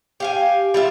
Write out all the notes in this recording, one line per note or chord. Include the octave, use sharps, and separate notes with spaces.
G4 F5 G#5
G3 F4 E5